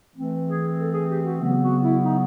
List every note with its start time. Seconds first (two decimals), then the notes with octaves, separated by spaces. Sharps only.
0.15 E3 A3 C4
0.47 G#4
0.78 A4
0.94 G#4
1.09 G4
1.25 F#4
1.40 C#3 F#3 B3
1.62 F#4
1.82 E4
2.04 D#4